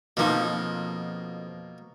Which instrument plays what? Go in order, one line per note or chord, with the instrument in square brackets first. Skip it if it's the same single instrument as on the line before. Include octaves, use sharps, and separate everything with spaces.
[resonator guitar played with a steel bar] F2 F3 D#4 [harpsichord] B2 A#3